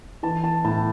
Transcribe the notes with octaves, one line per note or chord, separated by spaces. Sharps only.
E3 A5
A5
A2 A5